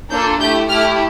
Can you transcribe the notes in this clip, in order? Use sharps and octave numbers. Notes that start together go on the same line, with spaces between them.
A#3 D4 F4 A4 G6
A3 E4 G4 G6
A3 E4 G4 F6